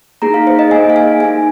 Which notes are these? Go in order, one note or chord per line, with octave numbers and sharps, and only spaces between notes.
A#3 D#4 G#4 A#5
F5
C5
D#5
A#3 D#4 G#4 G#5
F5
G#5
A#3 D#4 G#4 G#5